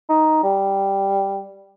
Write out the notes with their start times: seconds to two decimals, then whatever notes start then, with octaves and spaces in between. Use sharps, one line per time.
0.09 D#4
0.44 G3